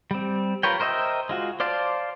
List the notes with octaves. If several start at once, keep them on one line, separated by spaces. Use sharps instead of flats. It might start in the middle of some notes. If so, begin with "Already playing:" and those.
G3 C4
F4 A#4 B4 C#5 G5
A#4 C5 D#5 E5 G5
G#3 F4 F#4
C5 D5 F5 A5 C6